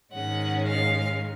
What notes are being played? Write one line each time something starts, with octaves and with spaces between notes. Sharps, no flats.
G#2 D#3 G#3 C#4 F#5
F5